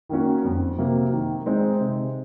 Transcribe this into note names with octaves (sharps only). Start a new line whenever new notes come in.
D#3 A#3 C#4 F#4
F2
C3 F#3 A#3
D#3
G#3 C4 D#4
C3